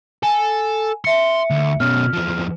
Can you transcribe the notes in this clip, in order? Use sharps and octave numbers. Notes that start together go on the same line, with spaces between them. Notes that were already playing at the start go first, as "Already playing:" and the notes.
A4 G#5
E5 C6 C#7
D2
B2 C#4 F6
E2 F3